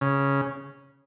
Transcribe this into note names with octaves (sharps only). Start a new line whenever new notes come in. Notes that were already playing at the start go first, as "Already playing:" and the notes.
C#3